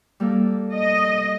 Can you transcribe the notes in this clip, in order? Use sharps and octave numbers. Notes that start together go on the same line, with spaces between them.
G3 A#3 A4
D#5